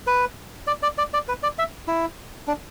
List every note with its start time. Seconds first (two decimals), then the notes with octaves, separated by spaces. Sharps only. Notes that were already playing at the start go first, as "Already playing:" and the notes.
0.07 B4
0.67 D5
0.83 D5
0.98 D5
1.13 D5
1.28 B4
1.43 D5
1.59 E5
1.88 E4
2.48 D4